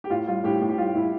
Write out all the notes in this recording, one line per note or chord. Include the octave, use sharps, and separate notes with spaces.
G4
A2 F4
G3 F4
A2 G4
A2
G4
G3 F4
A2 E4